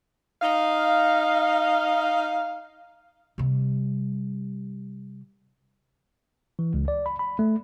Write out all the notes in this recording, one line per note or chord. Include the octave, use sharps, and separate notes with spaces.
D#4 F5
C3 G3
E3
C#2
D5
B5
B5
A3